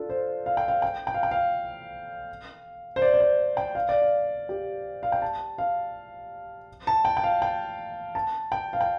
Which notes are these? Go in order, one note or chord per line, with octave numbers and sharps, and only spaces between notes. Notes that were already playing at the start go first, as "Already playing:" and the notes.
Already playing: D4 F4 A4
C5
F5
G5
F5
G5
G5
F5
G5
F5
C5
D5
D5
C5
G5
F5
D5
F5
G4
F5
G5
A5
F5
A5
G5
G5
F5
G5
A5
G5
F5
G5